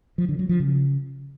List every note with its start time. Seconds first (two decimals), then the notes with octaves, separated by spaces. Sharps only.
0.18 F3
0.29 D3
0.39 F#3
0.49 F3
0.60 C#3